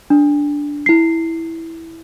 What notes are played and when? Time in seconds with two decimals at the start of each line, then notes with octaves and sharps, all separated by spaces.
0.10 D4
0.86 E4 C7